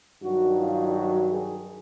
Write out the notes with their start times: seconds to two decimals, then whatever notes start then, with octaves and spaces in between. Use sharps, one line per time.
0.22 G2 D#3 F#3 F#4
0.58 F4
0.94 F#4
1.30 G#4